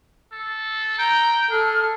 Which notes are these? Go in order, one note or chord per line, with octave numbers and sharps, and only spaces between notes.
A4
G5 A#5
G#4 A4 F6